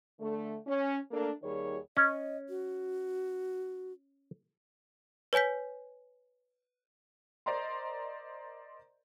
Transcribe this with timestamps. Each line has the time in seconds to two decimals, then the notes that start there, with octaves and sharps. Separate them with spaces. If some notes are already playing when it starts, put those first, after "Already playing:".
0.20 D3 A3
0.66 C#4
1.11 A3 A#3 D4 A4 A#4
1.42 D#2 D#3 G3 G#4 C#5
1.97 C#4 D#5
2.49 F#4
5.33 B4 C#5 G#5 G6 B6
7.46 A#4 C5 D5 D#5 A#5 C6